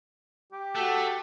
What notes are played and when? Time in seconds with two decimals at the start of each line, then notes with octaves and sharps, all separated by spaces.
0.52 G4
0.75 A3 F#4 A4